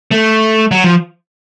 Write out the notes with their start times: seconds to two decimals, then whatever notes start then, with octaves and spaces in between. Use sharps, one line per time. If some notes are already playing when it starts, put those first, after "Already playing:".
0.12 A3
0.71 F#3
0.84 F3